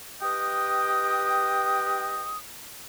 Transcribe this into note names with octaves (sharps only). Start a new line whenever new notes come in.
G4 B4 D#5 G5 D#6